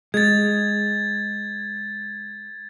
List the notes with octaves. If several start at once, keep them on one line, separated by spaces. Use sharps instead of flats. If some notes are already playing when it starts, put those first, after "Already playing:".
G#3 G#6 A6